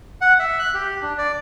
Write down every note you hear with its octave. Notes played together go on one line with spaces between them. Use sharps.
F#5
E5
F#6
G4
D4
D5